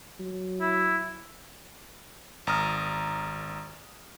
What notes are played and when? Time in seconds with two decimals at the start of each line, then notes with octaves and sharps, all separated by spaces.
0.19 F#3
0.61 E4
2.47 G#1 A#5 D#6 F6